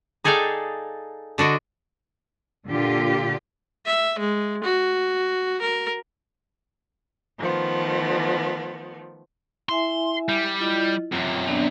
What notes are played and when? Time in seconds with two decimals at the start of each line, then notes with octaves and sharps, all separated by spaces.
0.24 D#4 G#4 A4 D5 F5 G5
1.38 D3 D4 F#4 D#5
2.67 A#2 D3 F4 G4
3.85 E5
4.18 G#3
4.64 F#4
5.61 A#4
7.38 D#3 F3 A3 B3
9.69 E4 E5 G#5 C6
10.29 G3
10.60 E4 F4 D#5
11.12 F#2 C3 F4
11.47 B3 D4 D5